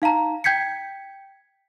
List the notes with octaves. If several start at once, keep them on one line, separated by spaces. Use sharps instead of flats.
D#4 F5 A5 A#5
G5 G6 G#6 B6 C#7